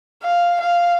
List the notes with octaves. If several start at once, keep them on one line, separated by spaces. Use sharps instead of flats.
F5
F5